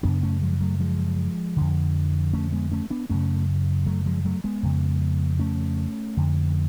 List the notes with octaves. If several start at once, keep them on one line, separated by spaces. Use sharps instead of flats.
F#2 C#3 B3 D4
A3 C#4
F3 G#3
F#3 A3
F3 G#3
F2 D3
A3 C#4
G#3 B3
A3 C#4
B3 D4
F#2 C#3 A3 C#4
F#3 A3
F3 G#3
F#3 A3
G#3 B3
F2 C#3
A3 C#4
F2 D3